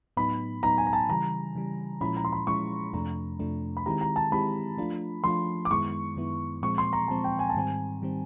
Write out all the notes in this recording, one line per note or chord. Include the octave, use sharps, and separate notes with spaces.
A2 F#3 B3 D#4 B5
A2 F#3 B3 D#4 A#5
G#5
A#5
A5
C#3 E3 G3 A#5
C#3 E3 G3
A#2 F3 G#3 C#4 E4 B5
A#5
C6
B5
A#2 F3 G#3 C#4 E4 C#6
F2 C3 F3 A3 D4 A#5
F2 C3 F3 A3 D4
B5
D#3 G#3 C4 E4 G4 A#5
A#5
A5
D#3 G#3 C4 E4 G4 B5
F3 A3 D4 F4
F3 A3 D4 F4 C6
D6
F#2 D#3 G#3 B3 E4 C#6
F#2 D#3 G#3 B3 E4
A#2 F3 G#3 C4 C#6
C6
A#5
A#2 F3 G#3 C4 A5
G5
G#5
A5
G#2 D#3 G3 C4 G#5
D#3 G3 C4